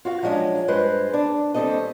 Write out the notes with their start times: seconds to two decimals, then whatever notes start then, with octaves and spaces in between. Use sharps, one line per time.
0.05 F4 F#4 F5
0.23 F3 F#3 G#3 C#4 D4
0.68 G2 G#3 B4 C5
1.14 D4
1.54 D#2 G3 C4 A4 D#5